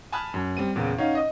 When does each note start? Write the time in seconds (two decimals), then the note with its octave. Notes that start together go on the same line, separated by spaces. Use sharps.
0.12 G#5 A5 B5 D#6 F6 F#6
0.34 F#2
0.57 G3 C4 D#7
0.75 E2 A#2 C#3
0.98 C#4 D#4 C#5 F5 F#5
1.15 D#5 D#6